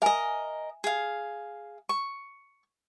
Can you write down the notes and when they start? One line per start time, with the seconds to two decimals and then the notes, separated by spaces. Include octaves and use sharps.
0.02 A#4 D#5 E5 G#5
0.84 G#4 F5
1.89 C#6